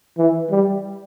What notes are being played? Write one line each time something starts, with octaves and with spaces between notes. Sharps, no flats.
E3
G3